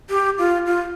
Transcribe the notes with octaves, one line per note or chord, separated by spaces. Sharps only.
G4
F4
F4